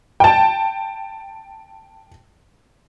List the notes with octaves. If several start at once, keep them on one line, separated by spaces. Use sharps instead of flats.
G5 A5